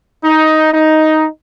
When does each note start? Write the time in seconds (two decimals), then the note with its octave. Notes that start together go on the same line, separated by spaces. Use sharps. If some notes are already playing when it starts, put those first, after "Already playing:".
0.23 D#4
0.74 D#4